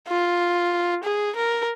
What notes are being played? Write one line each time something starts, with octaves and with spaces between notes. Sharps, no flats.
F4
G#4
A#4